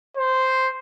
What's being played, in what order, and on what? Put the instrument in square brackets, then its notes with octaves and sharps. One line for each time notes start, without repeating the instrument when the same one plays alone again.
[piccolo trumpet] C5